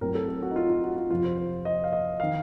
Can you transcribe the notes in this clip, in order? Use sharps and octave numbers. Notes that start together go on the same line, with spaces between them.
A2 F#3 C4 A#4
A4
A4
F#4
D#4
F4
F4
F#4
F4
F2 C3 F3 F4
C5
C5
D#5
F5
D#5
D#3 F5